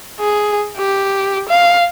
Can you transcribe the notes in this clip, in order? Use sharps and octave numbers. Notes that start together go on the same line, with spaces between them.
G#4
G4
F5